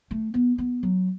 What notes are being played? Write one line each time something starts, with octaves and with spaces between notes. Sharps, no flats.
A3
B3
B3
F#3